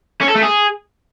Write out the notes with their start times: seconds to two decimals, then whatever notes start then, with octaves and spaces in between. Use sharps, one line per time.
0.21 C#4
0.28 A4
0.36 A3
0.43 G#4